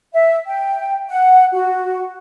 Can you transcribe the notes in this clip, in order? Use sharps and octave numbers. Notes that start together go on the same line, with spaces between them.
E5
G5
F#5
F#4